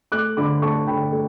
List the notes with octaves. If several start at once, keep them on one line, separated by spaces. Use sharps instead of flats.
A3 D6 F#6
D3 B5 D6
A3 A5 C#6
D3 G5 B5
A3